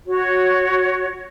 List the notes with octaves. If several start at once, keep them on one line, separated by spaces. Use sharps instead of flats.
F#4 C#5